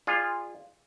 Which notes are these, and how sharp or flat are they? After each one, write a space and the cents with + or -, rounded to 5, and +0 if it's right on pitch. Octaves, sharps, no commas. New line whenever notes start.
F4 +0 G#4 -25 D5 +30